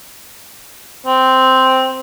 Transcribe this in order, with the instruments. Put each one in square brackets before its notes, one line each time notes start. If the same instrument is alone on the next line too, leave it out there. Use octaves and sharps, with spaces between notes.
[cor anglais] C4